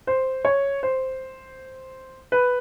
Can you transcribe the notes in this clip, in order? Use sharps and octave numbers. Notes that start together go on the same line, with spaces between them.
C5
C#5
C5
B4